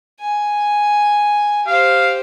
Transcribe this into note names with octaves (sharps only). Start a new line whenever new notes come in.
G#5
G4 C5 F5